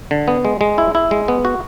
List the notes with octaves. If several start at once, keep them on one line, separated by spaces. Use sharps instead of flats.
D3
B3
G#3
G#3
E4
E4
G#3
B3
F#4